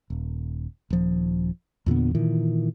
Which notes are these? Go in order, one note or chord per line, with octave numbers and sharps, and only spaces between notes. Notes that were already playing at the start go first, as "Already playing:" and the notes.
D#1
D#1 F3
E2 A#2 D3 B3
A#2 D#3 E3